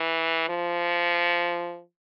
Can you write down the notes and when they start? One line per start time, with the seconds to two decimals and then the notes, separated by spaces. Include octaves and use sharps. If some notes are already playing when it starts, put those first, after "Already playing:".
Already playing: E3
0.49 F3